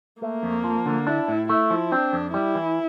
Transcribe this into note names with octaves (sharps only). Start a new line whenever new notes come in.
A3 A#3
F2
F3
D3
D4 E4
A2
A3 E4
F3
C4 D4
F2
G3 E4
E3